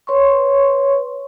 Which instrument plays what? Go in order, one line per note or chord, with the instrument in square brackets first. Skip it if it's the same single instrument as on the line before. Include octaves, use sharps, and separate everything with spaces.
[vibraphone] B4 C#5 C6 C#6